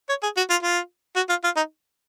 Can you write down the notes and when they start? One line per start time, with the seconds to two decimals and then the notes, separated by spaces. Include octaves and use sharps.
0.09 C#5
0.23 G#4
0.37 F#4
0.50 F4
0.63 F4
1.16 F#4
1.29 F4
1.44 F4
1.56 D#4